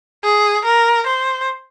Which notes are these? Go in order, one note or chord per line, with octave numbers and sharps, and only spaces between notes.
G#4
A#4
C5